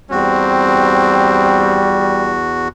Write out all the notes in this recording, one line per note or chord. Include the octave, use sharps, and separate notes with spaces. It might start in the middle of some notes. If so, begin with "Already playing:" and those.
E2 G3 C4 F#4